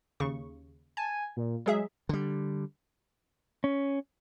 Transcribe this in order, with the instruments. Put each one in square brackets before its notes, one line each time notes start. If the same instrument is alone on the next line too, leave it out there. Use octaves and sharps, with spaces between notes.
[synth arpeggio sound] D#2 C#3 C#6
[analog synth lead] G#5 [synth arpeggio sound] A5
[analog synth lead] A#2
[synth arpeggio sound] F#3 G#4 E5 [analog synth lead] G#3
[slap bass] D3 G3
[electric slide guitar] C#4